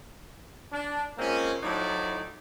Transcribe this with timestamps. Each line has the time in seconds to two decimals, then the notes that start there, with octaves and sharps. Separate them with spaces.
0.73 D4
1.18 F3 G#3 A#3 C4 C#4
1.63 A2 F3 F#3 D#4 E4 D5